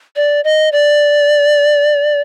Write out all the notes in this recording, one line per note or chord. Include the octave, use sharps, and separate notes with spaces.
D5
D#5
D5